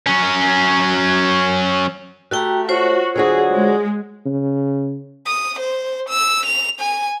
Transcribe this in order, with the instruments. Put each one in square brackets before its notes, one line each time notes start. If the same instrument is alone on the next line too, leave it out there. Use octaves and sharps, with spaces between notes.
[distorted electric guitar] F#3 C#4
[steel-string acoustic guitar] A3 G4 [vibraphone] F#4 G5 A#5
[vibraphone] F4 C5 C#5 [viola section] F#4
[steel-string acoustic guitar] D3 F#3 F#4 [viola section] G#4
[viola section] G#3
[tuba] C#3
[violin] D#6
C5
E6
F7
G#5